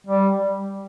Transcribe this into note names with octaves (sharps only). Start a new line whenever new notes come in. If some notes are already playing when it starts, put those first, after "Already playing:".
G3